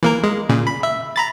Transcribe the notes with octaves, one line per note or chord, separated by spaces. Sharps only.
E3 A#3 A#4
G#3
A#2 C#3
B5
E5
A#5 B5 A6